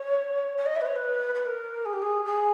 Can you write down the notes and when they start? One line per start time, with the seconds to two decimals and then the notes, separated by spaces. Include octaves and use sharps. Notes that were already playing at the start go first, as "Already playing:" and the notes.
Already playing: C#5
0.57 C#5
0.66 D#5
0.75 E5
0.81 B4
0.86 C#5
0.95 B4
1.34 B4
1.45 A#4
1.85 G#4
1.93 G4
2.02 G#4
2.25 G#4